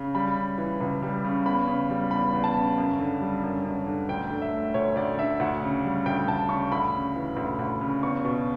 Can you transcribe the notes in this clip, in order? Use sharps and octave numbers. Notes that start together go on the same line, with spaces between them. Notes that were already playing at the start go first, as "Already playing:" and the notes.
Already playing: C#3
G3 B5
C#3
E3
C#2
G3
C#3
E2 B5
C#3
G3
E2 B5
E2
A5
C#3
F#2
D3
G3
F#2
F#2
D3
D2 G5
D3
E5
A3
D2 C#5
D2 D5
D3 E5
D2 F#5
C#3
G3
D2 G5
D2 A5
C#3 C#6
D2 B5
C#3
E3
D2
D2
C#3
E2 C#6
B2